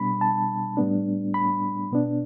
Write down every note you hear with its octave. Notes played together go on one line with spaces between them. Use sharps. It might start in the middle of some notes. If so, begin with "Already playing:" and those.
Already playing: B2 G3 B3 D4 B5
A5
A2 G3 B3 D4
B5
B2 B3 D4